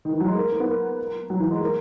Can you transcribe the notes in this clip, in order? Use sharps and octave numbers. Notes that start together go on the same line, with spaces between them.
D#3
E3
F#3
G#3
A#3
A#3
B3
A#3
F#3
E3
G#3
A#3